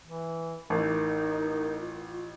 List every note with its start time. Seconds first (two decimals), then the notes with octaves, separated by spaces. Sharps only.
0.04 E3
0.70 A1 D#4 A#4
1.80 F4